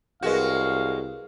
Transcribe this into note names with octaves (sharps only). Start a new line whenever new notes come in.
C2 G#3 F#4 G#4 A#4 B4 F5